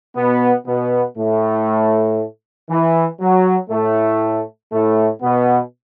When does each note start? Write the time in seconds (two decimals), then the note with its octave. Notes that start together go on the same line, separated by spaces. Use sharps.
0.16 B2 B3
0.66 B2 B3
1.17 A2 A3
2.69 E3
3.20 F#3
3.70 A2 A3
4.72 A2 A3
5.22 B2 B3